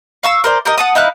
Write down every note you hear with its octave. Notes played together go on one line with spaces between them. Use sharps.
F5 C#6 E6
A#4 C5 D5
G4 A#4 D#5
F#5 A5 D#6
D#4 E4 F5 F#6